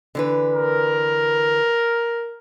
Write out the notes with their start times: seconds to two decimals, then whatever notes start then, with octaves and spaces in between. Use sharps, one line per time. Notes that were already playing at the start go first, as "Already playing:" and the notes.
0.15 D3 E3 B4
0.53 A#4